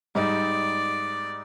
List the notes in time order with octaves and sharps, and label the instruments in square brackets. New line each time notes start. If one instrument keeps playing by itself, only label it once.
[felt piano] G#2 G3 D#4 [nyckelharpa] D5